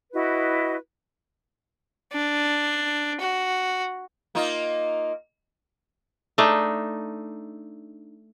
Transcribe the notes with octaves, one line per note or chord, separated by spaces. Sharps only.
E4 F#4 B4 D#5
D4
F#4
A#3 D#4 F4
A3 D4 D#4